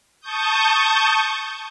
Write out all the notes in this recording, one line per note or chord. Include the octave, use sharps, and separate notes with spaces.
A5 C#6 D#6 G6